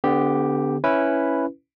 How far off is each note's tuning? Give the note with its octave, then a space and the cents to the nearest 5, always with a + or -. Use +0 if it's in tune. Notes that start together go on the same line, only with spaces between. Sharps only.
D3 -15 B3 +20 G4 +0
C#4 +0 E4 +0 B4 +0